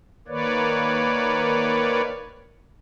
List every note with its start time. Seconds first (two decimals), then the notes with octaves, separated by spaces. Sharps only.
0.28 D#3 A#3 B4 C#5 D5